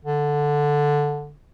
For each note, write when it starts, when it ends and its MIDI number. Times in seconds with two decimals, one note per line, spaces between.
0.05 1.34 50